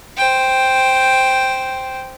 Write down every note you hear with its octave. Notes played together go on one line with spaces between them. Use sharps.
C5 G5